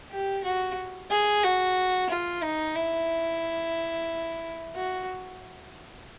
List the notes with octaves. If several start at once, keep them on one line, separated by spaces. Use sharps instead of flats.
G4
F#4
G#4
F#4
F4
D#4
E4
F#4